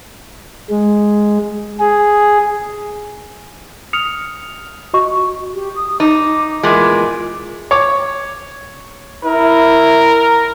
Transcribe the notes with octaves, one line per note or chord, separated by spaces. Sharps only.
G#3
G#4
D#6 F6 C#7 F7
F#4 D#5 C#6
G4
D#6
D#4 D6
E2 A#2 G#3 D6
C#5 D6
E4 A#4